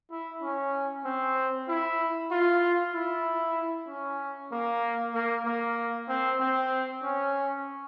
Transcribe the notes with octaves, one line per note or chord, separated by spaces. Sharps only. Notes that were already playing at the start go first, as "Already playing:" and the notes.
E4
C#4
C4
E4
F4
E4
C#4
A#3
A#3
A#3
C4
C4
C#4